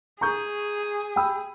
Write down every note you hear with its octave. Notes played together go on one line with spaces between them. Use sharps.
G#4 A#5 C#6 G6
G5 B5 E6